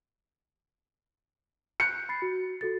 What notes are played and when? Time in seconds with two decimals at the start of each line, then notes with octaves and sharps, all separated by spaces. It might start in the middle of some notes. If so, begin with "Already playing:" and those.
1.80 F#6 G6 C#7
2.09 B5 A6 C7
2.22 F#4
2.61 F#4 A4 A6